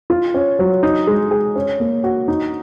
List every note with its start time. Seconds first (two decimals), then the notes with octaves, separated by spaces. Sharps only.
0.10 F4
0.34 C#4
0.59 F#3
0.83 D#4
1.07 G#3
1.31 G#4
1.56 C#4
1.80 A#3
2.04 F#4
2.28 D#4